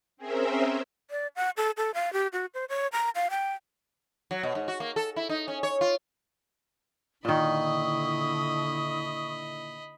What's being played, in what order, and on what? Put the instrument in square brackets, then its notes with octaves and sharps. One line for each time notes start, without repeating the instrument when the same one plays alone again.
[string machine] C4 C#4 G#4 A#4 C5 E5
[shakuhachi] D5
F#5
A4
A4
F5
G4
F#4
C5
C#5
A#5
F5
G5
[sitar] F#3
B2
G#2
F#4
A#3
A4
E4
D#4
C#4
C#5
F4
[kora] A#2 D#3 [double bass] D3 E4 [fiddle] D#5 B5 [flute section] C#6 D#6